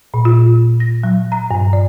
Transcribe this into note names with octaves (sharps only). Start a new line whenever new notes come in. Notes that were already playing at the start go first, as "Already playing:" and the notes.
A#2
F4
A#6
F#3
A#5
G2
D5